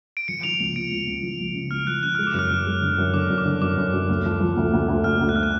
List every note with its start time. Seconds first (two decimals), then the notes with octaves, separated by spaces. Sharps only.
0.17 D7
0.28 F3 C#7
0.43 F3 F7
0.60 C#2 F7
0.76 C#2 D7
0.92 C#2
1.07 C#2
1.23 F3
1.40 C#2
1.55 C#3
1.71 C#2 F6
1.87 F3 F#6
2.03 C#3 F#6
2.15 G#3 F6
2.27 D6
2.34 F#2 F6
2.50 F#2
2.67 G#3
2.82 D3
2.98 F#2
3.14 D3 D6
3.30 F#2
3.38 D6
3.45 D3
3.62 F#2 D6
3.77 F#2
3.93 F#2
4.09 D2
4.26 F3
4.40 F3
4.57 D2
4.73 D2
4.88 D2
5.04 D2 F6
5.21 D2
5.29 F#6
5.36 F6
5.43 F#6